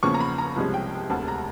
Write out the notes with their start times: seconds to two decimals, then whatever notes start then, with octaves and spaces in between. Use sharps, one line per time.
0.03 E2 C#3 F3 A#3 C#4 C#6
0.14 A#5
0.20 B5
0.38 A#5
0.56 C2 C3 F3 G#3 C#4
0.74 G5
1.10 E1 D2 C3 A5
1.28 A#5